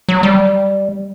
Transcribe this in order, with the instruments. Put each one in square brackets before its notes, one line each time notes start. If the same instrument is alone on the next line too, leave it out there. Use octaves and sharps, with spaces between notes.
[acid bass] F#3
G3